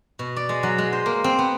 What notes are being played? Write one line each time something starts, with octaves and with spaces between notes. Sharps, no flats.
B2
D5
G#3
F#3
G#3
C5
A#3
C4
B3